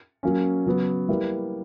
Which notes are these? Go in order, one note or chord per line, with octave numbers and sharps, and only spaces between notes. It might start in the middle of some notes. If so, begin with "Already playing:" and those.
F#3 A#3 C#4
C#3 F#3 B3
G3 A#3 E4 B4